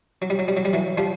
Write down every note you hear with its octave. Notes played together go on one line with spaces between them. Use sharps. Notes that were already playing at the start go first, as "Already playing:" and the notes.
F#3
G3
F#3
G3
F#3
G3
E3 F#3
F3 G3